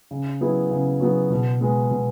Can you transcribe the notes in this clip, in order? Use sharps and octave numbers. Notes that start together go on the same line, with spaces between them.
C#3
F#3 B3 E4 G#4
C#3
F#3 B3 E4 G#4
B2
G#3 B3
B2